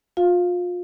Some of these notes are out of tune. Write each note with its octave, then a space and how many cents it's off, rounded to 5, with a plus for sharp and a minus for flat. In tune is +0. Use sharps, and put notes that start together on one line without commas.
F4 +35 F5 +0